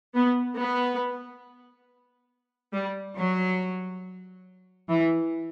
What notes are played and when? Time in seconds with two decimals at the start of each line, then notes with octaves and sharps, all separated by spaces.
0.15 B3
0.58 B3
2.73 G3
3.16 F#3
4.89 E3